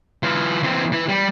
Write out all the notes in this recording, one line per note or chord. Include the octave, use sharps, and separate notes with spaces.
E3 F4
E3 C4
E3
G3